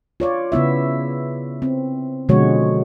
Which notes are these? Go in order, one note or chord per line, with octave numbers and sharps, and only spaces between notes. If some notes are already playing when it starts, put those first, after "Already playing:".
F4 C#5 D5
C#3 B3 E4 E5
C4
B2 D3 F3 G#3 F#4 C#5